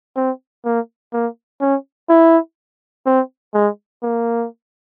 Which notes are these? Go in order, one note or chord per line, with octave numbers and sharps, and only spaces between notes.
C4
A#3
A#3
C#4
E4
C4
G#3
A#3